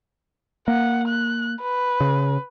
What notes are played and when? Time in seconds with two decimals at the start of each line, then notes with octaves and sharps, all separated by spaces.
0.68 A#3 F#5
1.08 F#6
1.63 B4
2.00 C#3